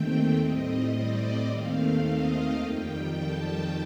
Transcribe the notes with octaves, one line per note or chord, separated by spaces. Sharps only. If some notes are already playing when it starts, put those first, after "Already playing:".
Already playing: D#2 D#3 A3 C4 G5
A2 G3 C4 D#5
D5
D#2 D#3 A3 C4 F5
D#5
F2 D#3 G3 G5
A5